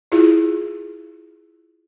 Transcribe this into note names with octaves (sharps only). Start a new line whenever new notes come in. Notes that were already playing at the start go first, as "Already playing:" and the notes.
E4 F4 G#4